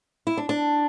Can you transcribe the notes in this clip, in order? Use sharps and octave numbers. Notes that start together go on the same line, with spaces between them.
E4
D4
D4